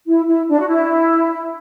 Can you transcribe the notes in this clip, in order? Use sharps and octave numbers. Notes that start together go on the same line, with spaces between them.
E4
E4
D4
F#4
E4